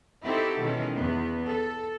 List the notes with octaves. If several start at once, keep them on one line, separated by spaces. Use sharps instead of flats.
C4 D#4 E4 F#4 G4 A4
B2 D#3 E3 G#3 C#4
E2 B3
A4